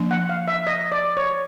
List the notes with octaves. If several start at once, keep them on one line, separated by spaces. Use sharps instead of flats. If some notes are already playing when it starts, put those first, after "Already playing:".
Already playing: F3 A#3 D4
F#5
F5
E5
D#5
D5
C#5